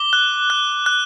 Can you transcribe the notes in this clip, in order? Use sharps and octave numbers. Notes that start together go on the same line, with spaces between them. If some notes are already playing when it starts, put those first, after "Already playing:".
Already playing: D6 G7
F#6
F#6
F#6